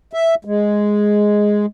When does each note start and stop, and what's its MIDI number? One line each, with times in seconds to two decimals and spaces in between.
0.13 0.35 76
0.45 1.66 56